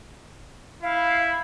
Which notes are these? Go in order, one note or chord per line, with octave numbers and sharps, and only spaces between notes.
E4 F5